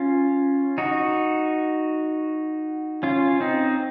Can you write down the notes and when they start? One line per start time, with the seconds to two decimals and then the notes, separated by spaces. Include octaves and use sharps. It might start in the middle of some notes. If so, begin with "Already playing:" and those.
Already playing: C#4 F4
0.78 D#4 F#4
3.03 C#4 F4
3.40 C4 D#4